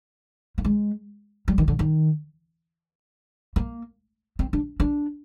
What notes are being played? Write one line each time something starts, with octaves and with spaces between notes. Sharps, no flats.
A#3
G#3
G3
D#3
D3
D#3
A#3
C4
D4
D4